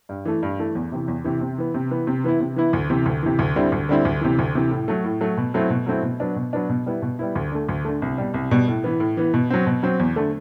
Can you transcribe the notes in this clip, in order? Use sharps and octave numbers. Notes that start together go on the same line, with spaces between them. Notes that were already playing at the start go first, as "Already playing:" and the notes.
G2
E3 A3
G2
E3 A3
E2
C3 E3
E2
C3 E3
C3
E3 B3
C3
E3 B3
C3
E3 B3 E4
C3
E3 B3 E4
D2
C3 E3
D2
C3 E3
D2
D3 G3 C4 E4
D2
D3 G3 C4 E4
D2
C3 E3
D2
C3 E3
A2
F#3 A3
A2
F#3 A3
B2
F#3 A3 C4 E4
B2
F#3 A3 C4 E4
B2
F#3 B3 D4
B2
F#3 B3 D4
B2
G3 B3 E4
B2
G3 B3 E4
D2
D3 A3
D2
D3 A3
C2
B2 G3
C2
B2 G3
A2
E3 B3
A2
E3 B3
B2
F#3 C4
B2
F#3 C4
E2
D3 A3